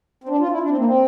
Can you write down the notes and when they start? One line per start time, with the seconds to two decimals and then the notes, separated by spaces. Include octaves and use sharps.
0.24 C4
0.29 D4
0.40 F4
0.51 E4
0.62 D4
0.69 C4
0.78 A#3
0.85 C4